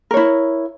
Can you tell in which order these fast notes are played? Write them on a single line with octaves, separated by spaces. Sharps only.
A#4 C#5 E4